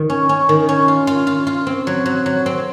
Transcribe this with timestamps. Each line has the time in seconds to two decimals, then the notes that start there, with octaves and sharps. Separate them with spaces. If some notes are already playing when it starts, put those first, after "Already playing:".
Already playing: D#3
0.10 C#4
0.29 C#4
0.49 D#3
0.69 C#4
0.88 F4
1.07 F4
1.27 F4
1.47 F4
1.67 C4
1.87 F#3
2.06 F#3
2.26 F#3
2.46 C4